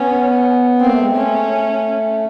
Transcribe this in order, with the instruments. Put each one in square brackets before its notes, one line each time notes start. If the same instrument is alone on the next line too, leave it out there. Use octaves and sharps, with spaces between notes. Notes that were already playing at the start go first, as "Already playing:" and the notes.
Already playing: [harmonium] B3 [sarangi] C#4
[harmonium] A#3 [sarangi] C4
[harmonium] A3
G#3
A3
[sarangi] C#4